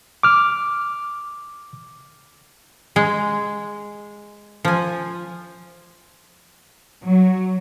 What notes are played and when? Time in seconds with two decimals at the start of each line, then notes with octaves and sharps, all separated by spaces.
0.23 D6 F6
2.96 G#3
4.65 F3 G#5
7.04 F#3